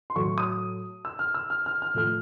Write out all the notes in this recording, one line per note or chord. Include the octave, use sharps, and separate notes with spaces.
C6
A2 F#3 A3 C#6
D#6
E6
F6
E6
F6
F6
F6
A2 F3 A3 F6